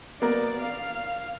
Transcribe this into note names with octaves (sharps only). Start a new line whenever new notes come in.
A#3 B3 A#4 D5
F5